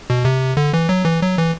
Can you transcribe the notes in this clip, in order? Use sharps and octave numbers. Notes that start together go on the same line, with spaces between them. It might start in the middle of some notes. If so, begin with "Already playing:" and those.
B2
C3
D3
E3
F#3
E3
F#3
E3